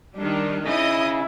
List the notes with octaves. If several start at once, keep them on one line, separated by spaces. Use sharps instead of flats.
D#3 G3 D4
C#3 D#4 E4 D#5 D#6